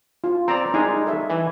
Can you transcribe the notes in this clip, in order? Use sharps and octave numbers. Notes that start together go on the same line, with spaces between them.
F4
C4 D5 A#5
G3 G#3 D#4 G#5
A4 E5
E3